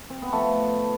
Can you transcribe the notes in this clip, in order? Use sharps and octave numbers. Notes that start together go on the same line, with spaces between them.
C4
B3
F3 A3